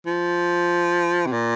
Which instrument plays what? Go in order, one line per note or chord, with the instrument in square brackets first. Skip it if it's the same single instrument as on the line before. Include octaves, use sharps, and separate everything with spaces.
[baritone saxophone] F3
C3
A#2